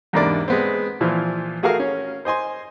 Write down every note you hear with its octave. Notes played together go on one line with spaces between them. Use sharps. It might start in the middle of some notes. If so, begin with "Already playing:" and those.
E2 G#2 C3 A#3 D4 D5
G#3 B3 C4
A#2 E3 F3
A3 F#4 G#4 A#4 F5
C#4
C5 D#5 G#5 C6